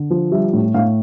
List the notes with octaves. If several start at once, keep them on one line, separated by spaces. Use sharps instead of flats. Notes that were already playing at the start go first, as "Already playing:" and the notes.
Already playing: D3
F3
G3 E5
A2
A2 F5